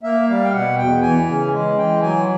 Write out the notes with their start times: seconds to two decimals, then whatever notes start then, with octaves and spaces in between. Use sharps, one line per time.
0.03 A#3 E5
0.28 G3 F5
0.44 G5
0.53 B2 F#5
0.78 E2 G5
1.02 E3 G#5
1.27 C#3
1.53 G#3
1.77 E3 G5
2.02 F#3 G#5